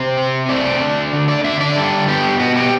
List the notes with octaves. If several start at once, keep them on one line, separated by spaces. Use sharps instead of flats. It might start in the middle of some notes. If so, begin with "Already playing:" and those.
Already playing: C3 C5
C4
A3 D5
D4
D3
D5
D3 E5
D5
G3 A4
B3 G4
B2 F#4
G4